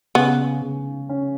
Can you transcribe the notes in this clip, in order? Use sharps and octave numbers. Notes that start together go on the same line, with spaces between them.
C#3 B3
C#3
C#4